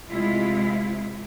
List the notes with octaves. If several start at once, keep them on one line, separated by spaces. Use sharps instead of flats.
C3 G#3 E4 F4